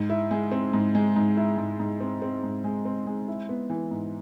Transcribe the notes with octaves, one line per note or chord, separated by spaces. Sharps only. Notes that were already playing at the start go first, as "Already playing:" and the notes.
Already playing: G#2
E4
G#3
C4
G#2
G#3
G#2
E4
G#2
G#2
C4
C4
G#2
G#3
C4
G#3
E4
B3
E3
G#2